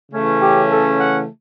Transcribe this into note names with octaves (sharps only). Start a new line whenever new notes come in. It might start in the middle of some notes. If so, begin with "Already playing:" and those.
C#3 E3 A3 C#4
G4
A4
F#5